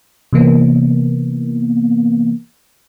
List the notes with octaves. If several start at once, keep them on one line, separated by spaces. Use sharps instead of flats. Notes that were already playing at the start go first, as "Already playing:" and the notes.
C3 E3 A#3 B3